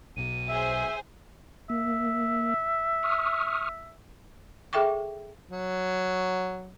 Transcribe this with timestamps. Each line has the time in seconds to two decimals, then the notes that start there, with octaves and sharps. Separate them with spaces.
0.17 B1 B2 D#7
0.48 G#4 C5 E5 G#5
1.70 A#3 E5
3.03 C#6 D#6 F6
4.73 G#4 A4 E5 G5 C#6 D6
5.51 F#3